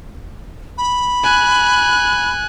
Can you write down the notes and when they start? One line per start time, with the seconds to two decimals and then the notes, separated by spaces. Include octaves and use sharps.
0.78 B5
1.23 G#5 F#6